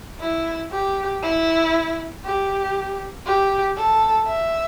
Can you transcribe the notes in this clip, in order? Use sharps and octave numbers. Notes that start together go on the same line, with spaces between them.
E4
G4
E4
G4
G4
A4
E5